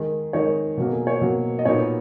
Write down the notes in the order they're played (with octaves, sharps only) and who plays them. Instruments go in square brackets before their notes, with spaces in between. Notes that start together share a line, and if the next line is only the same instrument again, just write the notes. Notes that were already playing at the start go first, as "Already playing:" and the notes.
Already playing: [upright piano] D#3 G#3 D#4
D#3 G#3 D#4 C#5
B2 F#3 A#3
G#4
C#5
B2 F#3 A#3
D#5
A#2 F#3 B3 D#4 C#5